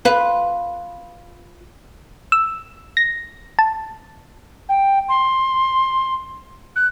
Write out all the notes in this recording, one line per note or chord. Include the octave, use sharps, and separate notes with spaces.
F4 B4
E6
A#6
A5
G5
C6
F#6